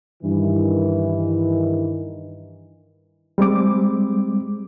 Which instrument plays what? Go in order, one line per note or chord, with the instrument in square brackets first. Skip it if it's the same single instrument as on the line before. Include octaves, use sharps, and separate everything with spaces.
[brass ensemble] G2 D#3 E3
[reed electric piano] G3 G#3 C4 D6